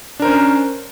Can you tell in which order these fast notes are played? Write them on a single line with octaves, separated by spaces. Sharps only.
D4 A#4 C5 C#4